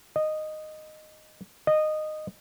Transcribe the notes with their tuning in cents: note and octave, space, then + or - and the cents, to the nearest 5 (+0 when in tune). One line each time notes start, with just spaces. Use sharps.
D#5 -10
D#5 -15